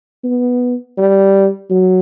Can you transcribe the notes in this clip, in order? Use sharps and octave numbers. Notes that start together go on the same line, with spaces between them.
B3
G3
F#3